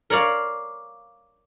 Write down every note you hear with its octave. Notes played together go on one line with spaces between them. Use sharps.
A#4 C#5 D5 F5